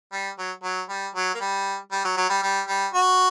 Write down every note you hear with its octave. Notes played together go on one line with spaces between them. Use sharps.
G3
F#3
F#3
G3
F#3
A#3
G3
G3
F#3
F#3
G3
G3
G3
F#4